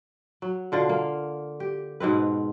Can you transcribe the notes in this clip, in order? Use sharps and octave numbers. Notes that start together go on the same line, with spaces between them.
F#3
B2 D3 F4
A#3
G4
G#2 B2 C4 B4